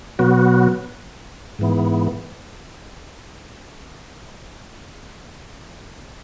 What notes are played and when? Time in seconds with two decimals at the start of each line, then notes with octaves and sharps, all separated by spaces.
0.19 B2 F#3 B3 F#4
1.59 G#2 E3 B3